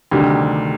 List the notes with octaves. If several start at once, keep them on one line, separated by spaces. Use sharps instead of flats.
D2 C3 D#3 G3